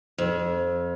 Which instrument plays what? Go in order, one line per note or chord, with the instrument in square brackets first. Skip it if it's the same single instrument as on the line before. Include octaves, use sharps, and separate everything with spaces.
[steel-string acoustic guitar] F2